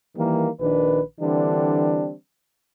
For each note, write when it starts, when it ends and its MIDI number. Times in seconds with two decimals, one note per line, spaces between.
0.17 0.48 51
0.17 0.48 52
0.17 0.48 55
0.17 0.48 58
0.61 1.00 34
0.61 1.00 51
0.61 1.00 62
0.61 1.00 71
1.20 2.13 50
1.20 2.13 52
1.20 2.13 55
1.20 2.13 60
1.20 2.13 62